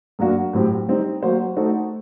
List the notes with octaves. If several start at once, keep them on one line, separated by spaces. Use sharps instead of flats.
F#2 F#3 A#3 D4 F#4
A2 F#3 C4 G4
G3 C4 D#4
F#3 A#3 F#4 C5
A3 D#4 F#4 A4 C5